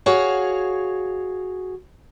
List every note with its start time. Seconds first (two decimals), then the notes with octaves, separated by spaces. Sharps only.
0.06 F#4 G#4 C#5 F5